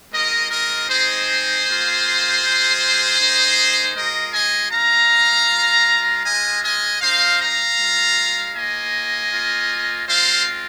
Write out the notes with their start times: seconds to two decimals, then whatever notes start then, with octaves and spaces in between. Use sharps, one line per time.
0.12 G#3 C4 F4 A#4 D#5
0.51 A#4 D#5
0.89 G#3 C4 D#4 G#4 C5
1.66 A#3 F4
2.42 G#3 F4
3.19 A#3 D#4
3.95 G#3 F4 A#4 D#5
4.33 D#5 G#5
4.71 G#3 D#4 F5 A#5
5.48 G#3 F4
6.25 G#3 F4 D#5 G#5
6.63 D#5 G#5
7.01 G#3 D#4 C5 F5
7.40 F5 A#5
7.78 G#3 F4
8.54 A#3 F4 D#5 G#5
9.31 A#3 F4
10.08 G#3 C4 F4 C5 F5